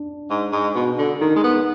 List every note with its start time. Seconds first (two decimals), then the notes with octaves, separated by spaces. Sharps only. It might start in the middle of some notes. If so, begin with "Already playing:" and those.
Already playing: D4
0.30 G#2
0.53 G#2
0.76 B2
0.99 D3
1.21 D#3 D#4
1.36 G#3
1.44 B3